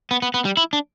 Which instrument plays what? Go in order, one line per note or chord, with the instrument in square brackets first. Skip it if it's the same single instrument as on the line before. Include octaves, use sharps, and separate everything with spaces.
[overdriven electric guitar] B3
B3
B3
G3
E4
D4